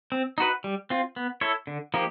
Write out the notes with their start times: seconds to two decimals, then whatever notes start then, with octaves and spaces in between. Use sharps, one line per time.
0.12 C4
0.38 D#4 F#4 B4
0.64 G3
0.90 C4 F4
1.16 B3
1.41 E4 A4 C#5
1.67 D3
1.94 F3 A#3 D#4 G4